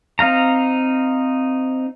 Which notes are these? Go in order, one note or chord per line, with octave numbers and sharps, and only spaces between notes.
C4 D#4 F5 A#5